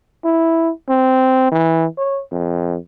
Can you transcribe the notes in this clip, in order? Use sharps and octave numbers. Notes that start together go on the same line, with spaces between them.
E4
C4
E3
C#5
F2